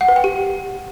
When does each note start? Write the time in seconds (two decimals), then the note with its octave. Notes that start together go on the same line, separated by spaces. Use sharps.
0.01 F#5
0.08 B4
0.16 G5
0.24 G4